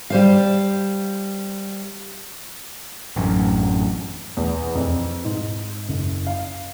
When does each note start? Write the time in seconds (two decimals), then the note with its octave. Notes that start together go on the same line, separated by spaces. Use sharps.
0.10 G3 C5 F5
3.16 A1 F#2
4.37 E2
4.75 F2
5.25 G#2
5.88 F#1
6.27 F5